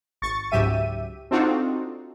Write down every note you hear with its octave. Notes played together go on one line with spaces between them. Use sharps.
G#1 C#6 A6
C#2 G#2 F#3 G4 E5 D#7
C4 D4 D#4 F4 F#4 A4